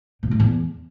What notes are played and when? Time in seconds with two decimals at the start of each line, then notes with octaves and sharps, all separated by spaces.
0.23 B2
0.31 A2
0.40 E2